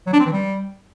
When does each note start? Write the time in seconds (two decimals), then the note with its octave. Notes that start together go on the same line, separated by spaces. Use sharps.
0.07 F#3
0.13 D4
0.20 C4
0.26 E3
0.33 G3